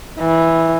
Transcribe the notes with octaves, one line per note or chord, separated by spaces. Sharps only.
E3